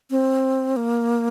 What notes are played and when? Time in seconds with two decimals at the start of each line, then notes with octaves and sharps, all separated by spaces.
0.10 C4
0.76 A#3